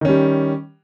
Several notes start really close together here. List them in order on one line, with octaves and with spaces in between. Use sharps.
D#3 C#4 G3